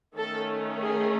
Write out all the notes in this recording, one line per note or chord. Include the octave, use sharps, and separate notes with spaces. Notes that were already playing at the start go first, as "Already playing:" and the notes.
D#3 A3 C#4 A4
G#4